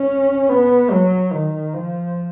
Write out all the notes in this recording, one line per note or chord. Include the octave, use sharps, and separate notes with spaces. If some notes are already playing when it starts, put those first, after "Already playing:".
Already playing: C#4
B3
F#3
D#3
F3